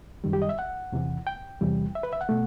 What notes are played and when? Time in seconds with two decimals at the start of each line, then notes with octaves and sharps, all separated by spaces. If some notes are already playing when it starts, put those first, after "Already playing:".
0.24 F#2 D#3 G3
0.33 G4
0.42 D#5
0.49 E5
0.59 F#5
0.92 E2 C3 E3
1.27 G5
1.61 E2 C3 E3 G3
1.95 E5
2.03 B4
2.13 E5
2.21 F#5
2.29 B2 A3